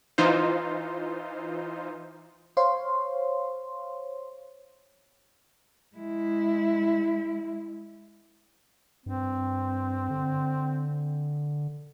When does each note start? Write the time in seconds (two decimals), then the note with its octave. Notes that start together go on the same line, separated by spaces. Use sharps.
0.18 E3 D#4 F4 C5
2.57 C5 C#5 F5 C6
5.96 G#3 E4
9.06 G2 C4
10.10 D3